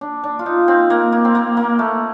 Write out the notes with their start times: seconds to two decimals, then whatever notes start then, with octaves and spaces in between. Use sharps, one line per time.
0.01 D4
0.24 D4
0.39 F4
0.46 D#4
0.68 C4
0.90 A#3
1.12 A#3
1.25 C4
1.35 A#3
1.57 A#3
1.79 A3